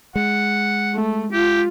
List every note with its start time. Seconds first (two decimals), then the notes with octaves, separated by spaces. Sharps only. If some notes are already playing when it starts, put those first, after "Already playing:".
0.16 G#3 F#5
0.95 A3
1.33 F4 G4